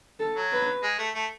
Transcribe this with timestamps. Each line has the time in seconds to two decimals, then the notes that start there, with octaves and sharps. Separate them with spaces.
0.20 A4
0.36 F#3
0.52 B4
0.83 G#3
0.99 A3
1.15 A3